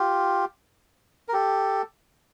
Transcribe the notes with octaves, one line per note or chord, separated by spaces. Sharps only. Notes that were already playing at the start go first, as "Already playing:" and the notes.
Already playing: F4 G4
A#4
G4 A4